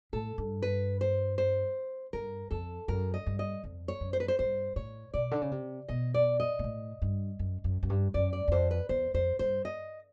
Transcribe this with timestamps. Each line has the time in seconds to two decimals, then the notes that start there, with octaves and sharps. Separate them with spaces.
0.13 A2 A4
0.38 G2
0.62 B4
1.01 C5
1.38 C5
2.13 G2 A#4
2.51 F2 A4
2.88 F#2 A#4
3.14 D#5
3.26 G2
3.39 D#5
3.64 F2
3.88 C#5
4.01 F#2
4.13 C5
4.20 B4
4.28 C5
4.39 G2 C5
4.76 A2 C#5
5.14 B2 D5
5.31 D3
5.41 C#3
5.51 C3
5.88 B2 D#5
6.14 D5
6.40 D#5
6.59 A#2
6.64 A2
7.02 G2
7.39 F#2
7.64 F#2
7.83 F#2
7.90 G2
8.14 F#2 D5
8.33 D5
8.48 E2
8.52 F2 C5
8.71 B4
8.89 E2 C5
9.14 F2 C5
9.39 G2 C5
9.65 D#5